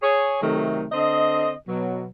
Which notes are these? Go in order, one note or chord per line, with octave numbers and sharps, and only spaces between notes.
G#4 C#5
C3 D#3 F#3 A3
D3 C4 D#5
B2 F#3